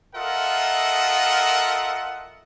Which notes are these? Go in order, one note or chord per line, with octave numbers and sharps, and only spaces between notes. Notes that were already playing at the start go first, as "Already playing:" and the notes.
F4 A4 A#4 D#5 E5 F#5